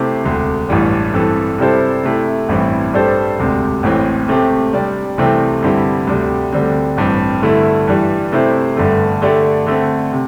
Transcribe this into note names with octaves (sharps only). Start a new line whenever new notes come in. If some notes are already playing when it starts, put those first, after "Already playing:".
Already playing: C3 A3 E4 G4 C5
E1 D2 C3
A1 G2 E3 G3
G2 E3 C4 A4
C3 G3 E4 A4 C5
C3 A3 E4
A1 G2 E3 C4 E4
G2 G3 D4 A4 C5
E1 D2 C3
A1 A2 E3 C4
C3 A3 C4 G4
C3 G3 D4 G4 D5
C2 C3 E3 A3 C4
G2 D3 C4 E4 G4
D2 C3 G3
D2 D3 G3 C4
A1 G2 E3 C4
G2 D3 A3 E4
G2 E3 G3
C3 A3 E4 C5
G1 G2 D3 A3
D3 A3 D4 G4 D5
D3 A3 C4
C3